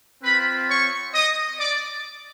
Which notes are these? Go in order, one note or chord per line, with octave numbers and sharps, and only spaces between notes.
C4 F4 B4 B5
C#5 C#6
D#5 D#6
D5 D6